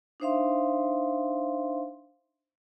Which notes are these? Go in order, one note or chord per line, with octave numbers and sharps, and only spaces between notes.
D4 D#4 C5 E5 F5 C6